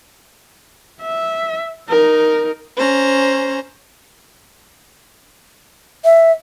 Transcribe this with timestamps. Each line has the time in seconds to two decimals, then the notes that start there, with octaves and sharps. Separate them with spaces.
1.01 E5
1.90 D#4 A#4
2.77 C#4 C5 A#5
6.05 E5